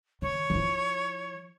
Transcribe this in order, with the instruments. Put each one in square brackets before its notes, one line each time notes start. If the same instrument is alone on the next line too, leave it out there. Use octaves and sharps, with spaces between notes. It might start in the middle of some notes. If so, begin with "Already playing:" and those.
[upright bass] D#3 [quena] C#5
[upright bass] F3 E4